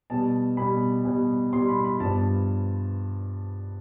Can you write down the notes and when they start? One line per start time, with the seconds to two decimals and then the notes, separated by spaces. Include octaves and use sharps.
0.10 B2 G3 B3 A5
0.57 B2 G3 B3 B5
1.05 B2 G3 B3
1.53 B2 G3 B3 C6
1.68 B5
1.84 B5
2.00 G2 F3 B3 A5